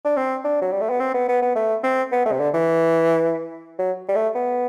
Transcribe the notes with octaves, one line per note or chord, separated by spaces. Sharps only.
D4
C4
D4
F#3
G3
A3
B3
C4
B3
B3
B3
A3
C4
B3
A3
C3
D3
E3
F#3
G3
A3
B3